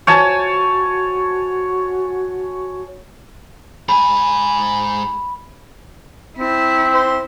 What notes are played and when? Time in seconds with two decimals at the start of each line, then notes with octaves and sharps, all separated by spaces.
0.07 F#4 C#5 G#5 A5
3.89 G#2 G#5 B5
6.38 C4 E4
6.94 C5